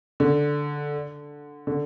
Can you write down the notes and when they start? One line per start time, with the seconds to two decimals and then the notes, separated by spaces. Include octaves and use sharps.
0.20 D3
1.67 D3